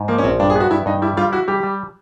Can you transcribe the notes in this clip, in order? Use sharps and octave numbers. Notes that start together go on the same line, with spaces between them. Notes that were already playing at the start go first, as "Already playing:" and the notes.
Already playing: G#2
F3 A#3
C#4
A#1 C4
G2 D4
G#4
B3 F#4
G2 E4
G2 D#4
G3 E4
G3 F4
E4 F#4
G3 G4
G3